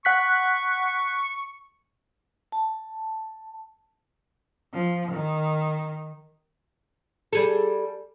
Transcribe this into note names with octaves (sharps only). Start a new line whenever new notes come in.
F#5 C#6 F#6 B6
A5
F3
D#3
G3 G#4 A4